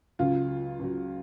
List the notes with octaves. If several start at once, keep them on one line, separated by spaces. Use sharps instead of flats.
C#2 C#3 F#3 F4
C#2 C#3 F#3